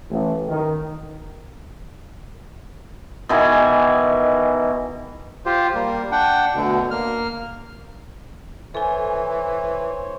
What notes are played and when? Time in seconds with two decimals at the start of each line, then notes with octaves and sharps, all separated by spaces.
0.11 A1
0.48 D#3
3.29 B2 D#3 E3 G#5
5.46 F4 G4 C5
5.75 G3 A#3
6.12 D4 F#5 G5
6.55 D2 B2 D3
6.91 A#3 F6
8.75 E3 A4 C5 C#5 G#5